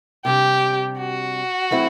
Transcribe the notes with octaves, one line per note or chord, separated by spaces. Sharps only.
C3 G3 D4 G4
F#4
F#3 A3 C4 E4